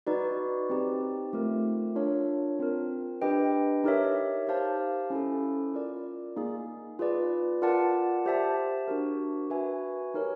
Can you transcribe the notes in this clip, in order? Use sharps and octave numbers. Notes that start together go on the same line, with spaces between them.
D#4 F#4 B4 D5
C4 D#4 G4
A3 C4 F4 A#4
D4 F4 A#4 C#5
C4 F4 A#4
D4 G4 B4 D#5 G5
D#4 G4 A#4 C#5 E5
G4 C5 F5 A5
C#4 E4 A4
F4 A#4 D5
A#3 D#4 G#4
F4 G#4 B4 D5
F4 A#4 D5 F#5 A5
G4 C5 E5 A5
D4 F#4 A#4
F#4 B4 E5 G#5
D#4 G4 A#4 C#5